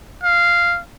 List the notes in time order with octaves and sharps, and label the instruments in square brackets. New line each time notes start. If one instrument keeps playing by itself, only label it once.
[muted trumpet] F5